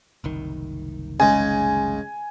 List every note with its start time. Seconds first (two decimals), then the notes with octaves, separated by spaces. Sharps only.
0.24 F#1 C2 D#3
1.20 C#3 G#3 G#5